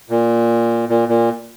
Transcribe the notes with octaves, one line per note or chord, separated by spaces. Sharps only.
A#2
A#2
A#2